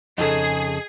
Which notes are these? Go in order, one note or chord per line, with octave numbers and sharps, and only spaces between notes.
F2 C#3 D#4 G#4 A4